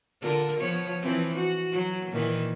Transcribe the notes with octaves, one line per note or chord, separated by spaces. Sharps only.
D3 F4 A#4
F3 B3 C#5
E3 F3 C4
F#4
F#3
A#2 D#3 E3